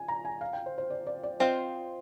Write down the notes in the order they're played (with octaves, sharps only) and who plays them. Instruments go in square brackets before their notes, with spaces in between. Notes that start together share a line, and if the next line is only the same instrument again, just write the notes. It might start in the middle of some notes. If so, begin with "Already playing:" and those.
Already playing: [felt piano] G#5
A#5
G#5
F5
G5
C5
C5
D5
D5
D5
[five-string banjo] C4 F4 C5 [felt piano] D#5